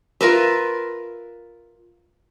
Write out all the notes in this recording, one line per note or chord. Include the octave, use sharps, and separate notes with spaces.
F4 A#4 B4 E5